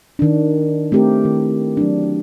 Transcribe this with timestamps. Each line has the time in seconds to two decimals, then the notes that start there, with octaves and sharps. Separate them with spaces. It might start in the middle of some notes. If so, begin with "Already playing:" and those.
0.19 D#3 D4
0.92 A3 C4 G4 A#4
1.24 D#3 E4
1.77 F#3 D4